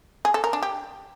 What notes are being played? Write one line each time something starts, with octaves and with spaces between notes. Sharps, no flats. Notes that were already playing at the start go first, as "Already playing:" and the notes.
G#4
A4
A#4
D4
G4